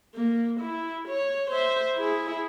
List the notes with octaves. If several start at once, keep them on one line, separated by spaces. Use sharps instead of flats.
A#3
E4
C#5
C5 E5
E4 G#4